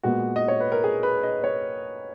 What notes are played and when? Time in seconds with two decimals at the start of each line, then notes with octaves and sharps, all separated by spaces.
0.03 A#2 G#3 B3 F#4
0.36 D#5
0.48 C#5
0.60 B4
0.72 A#4
0.84 G#4
1.03 B4
1.23 D#5
1.44 C#5